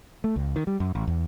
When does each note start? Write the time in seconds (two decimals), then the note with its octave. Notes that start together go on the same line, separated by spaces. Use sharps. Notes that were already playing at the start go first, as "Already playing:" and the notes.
0.24 A3
0.36 C#2
0.56 D#3
0.67 G3
0.80 F#2
0.95 A1
1.07 E2